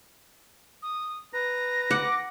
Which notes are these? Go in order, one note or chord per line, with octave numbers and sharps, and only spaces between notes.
D#6
B4 A#5 A#6
F#5 D6